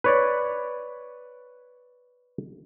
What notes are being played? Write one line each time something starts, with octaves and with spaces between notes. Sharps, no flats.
B4 C#5 D5